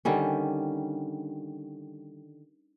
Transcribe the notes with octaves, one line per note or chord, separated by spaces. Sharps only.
D3 D#3 G3 C#4